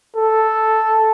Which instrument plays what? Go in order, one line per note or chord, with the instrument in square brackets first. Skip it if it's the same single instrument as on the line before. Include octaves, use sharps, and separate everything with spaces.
[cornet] A4